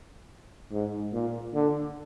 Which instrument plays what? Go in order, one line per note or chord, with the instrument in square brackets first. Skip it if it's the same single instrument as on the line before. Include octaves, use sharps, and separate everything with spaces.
[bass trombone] G#2
A#2
D3